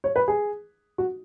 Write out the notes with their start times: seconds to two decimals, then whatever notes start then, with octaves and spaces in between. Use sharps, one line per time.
0.04 C#5
0.16 B4
0.28 G#4
0.98 F#4